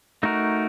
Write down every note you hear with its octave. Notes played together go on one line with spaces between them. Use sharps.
A3 D#4 F#4 A#4